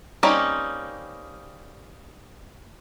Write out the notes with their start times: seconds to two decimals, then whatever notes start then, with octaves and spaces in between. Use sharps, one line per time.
0.23 G3 A#3 C4 C#4 D#4